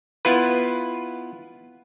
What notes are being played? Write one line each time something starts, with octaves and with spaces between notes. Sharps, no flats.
B3 E4 F4 B4